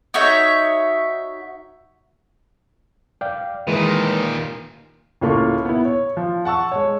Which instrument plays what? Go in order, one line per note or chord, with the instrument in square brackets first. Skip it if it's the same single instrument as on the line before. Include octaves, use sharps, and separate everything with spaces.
[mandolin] D#4 F#4 C#5 E5
[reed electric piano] D5 F5 G5
[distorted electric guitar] A#2 D#3 [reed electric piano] E3 G#3 B4
[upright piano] C#2 A2 A#3 F4 A4 C#6
B3 E4
C#5
F3
F#5 A5 C#6 E6
G#3 C#5